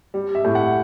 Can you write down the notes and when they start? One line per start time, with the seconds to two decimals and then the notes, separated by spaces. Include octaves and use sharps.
0.14 G3
0.35 E5
0.45 A2
0.55 F#5